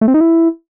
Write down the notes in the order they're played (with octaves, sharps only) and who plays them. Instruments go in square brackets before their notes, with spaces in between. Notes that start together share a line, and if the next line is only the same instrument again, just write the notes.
[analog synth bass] A3
C4
D#4
E4